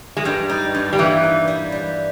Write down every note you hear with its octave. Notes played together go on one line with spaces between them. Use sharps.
G#3
G2 G3
D#4
G2
G3
E3 A#3
D#4
G3
G3